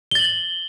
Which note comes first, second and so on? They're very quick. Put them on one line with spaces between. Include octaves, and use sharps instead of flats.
G7 A6 F#7